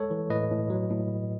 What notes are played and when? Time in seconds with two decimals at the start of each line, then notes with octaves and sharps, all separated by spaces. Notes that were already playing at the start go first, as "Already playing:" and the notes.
Already playing: G#3 A4 C#5
0.11 E3
0.30 A2 B4 D#5
0.51 A2
0.70 F#3
0.90 A2